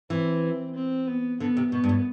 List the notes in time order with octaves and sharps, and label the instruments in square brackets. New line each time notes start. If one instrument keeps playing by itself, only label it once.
[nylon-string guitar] E3 [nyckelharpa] C4
[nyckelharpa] C4
B3
[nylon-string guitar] D3 [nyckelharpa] B3
[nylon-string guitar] C3
[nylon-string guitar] B2 [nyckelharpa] B3
[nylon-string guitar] G2
A2